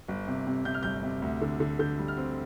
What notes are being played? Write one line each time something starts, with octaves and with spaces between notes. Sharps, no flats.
G1
C3
C3
C3 G6
F6
G1 G6
C3
D2
D3
D3
D3 G6
G3
F6
C4